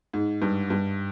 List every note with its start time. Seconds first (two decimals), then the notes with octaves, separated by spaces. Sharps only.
0.14 G#2
0.42 G2
0.70 G2